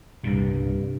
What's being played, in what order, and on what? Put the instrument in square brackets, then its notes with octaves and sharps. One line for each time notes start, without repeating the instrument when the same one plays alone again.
[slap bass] C2 A#2 [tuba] G2